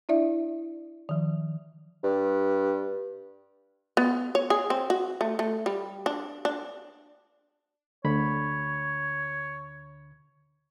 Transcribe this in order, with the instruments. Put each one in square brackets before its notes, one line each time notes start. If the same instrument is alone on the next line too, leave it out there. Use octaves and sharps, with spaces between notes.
[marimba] D4 E4 D5 E5
D#3 F3
[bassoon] G2
[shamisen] B3
C#5
G#4
C4
F#4
A3
A3
G3
D4
D4
[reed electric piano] D2 D3 B5 [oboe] C#5